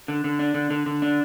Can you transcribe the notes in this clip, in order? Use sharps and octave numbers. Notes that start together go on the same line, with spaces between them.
D3
D3
D4
D3
D3
D3
D4